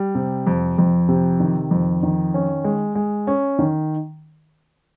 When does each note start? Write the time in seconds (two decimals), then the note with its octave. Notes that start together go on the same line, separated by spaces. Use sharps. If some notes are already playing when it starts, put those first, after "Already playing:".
Already playing: G3
0.15 C3
0.47 F2
0.78 F2
1.08 C3
1.40 D#3
1.71 F2
2.03 D#3
2.34 C#4
2.64 G#3
2.95 G#3
3.27 C#4
3.59 D#3